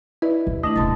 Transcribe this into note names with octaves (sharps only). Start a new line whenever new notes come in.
E4 B4 D5 D#5
D#2
A3 D4 E4 D#5
D#1 G#2 C#3 A5 A6